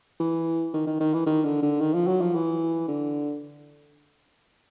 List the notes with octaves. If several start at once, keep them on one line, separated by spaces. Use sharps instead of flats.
E3
D#3
D#3
D#3
E3
D#3
D3
D3
D#3
F3
F#3
F3
E3
D3